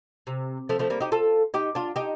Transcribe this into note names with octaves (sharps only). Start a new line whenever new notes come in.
C3
F3 A3
F3 A3
G3 A#3
D#4 G4
F4 A4
D#4 G4
D4 F4
D#4 G4